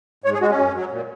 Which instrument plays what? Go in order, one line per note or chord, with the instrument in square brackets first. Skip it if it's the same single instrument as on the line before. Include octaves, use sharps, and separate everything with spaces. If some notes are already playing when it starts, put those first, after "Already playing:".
[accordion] G#2 C#5
G#4
G#3 F#4
C#4
F#2
F#3
A#2